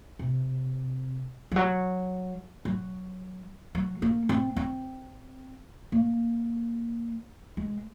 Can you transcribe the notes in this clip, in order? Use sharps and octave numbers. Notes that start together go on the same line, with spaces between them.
C3
F3
F#3
F#3
F#3
A#3
C4
C4
A#3
G#3